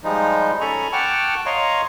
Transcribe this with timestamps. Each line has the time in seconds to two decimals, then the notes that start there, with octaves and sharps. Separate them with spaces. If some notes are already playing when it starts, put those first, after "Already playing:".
0.04 F3 G3 G#3 D#4
0.61 C#4 A4 G#5 A#5 B5 C#6
0.92 F#5 G5 A5 C#6 D6 F6
1.46 C#5 D#5 F5 A#5 C6 C#6